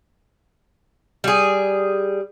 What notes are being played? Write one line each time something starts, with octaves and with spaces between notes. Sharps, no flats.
G3 G#4